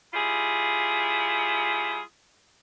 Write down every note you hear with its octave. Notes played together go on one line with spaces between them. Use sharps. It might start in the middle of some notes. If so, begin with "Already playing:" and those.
G3 E4 F4 G#4